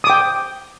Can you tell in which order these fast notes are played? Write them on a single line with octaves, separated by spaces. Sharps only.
D#6 D6 G5